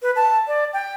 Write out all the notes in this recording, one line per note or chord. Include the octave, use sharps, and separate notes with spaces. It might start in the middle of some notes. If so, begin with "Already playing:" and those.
B4
A5
D5
G5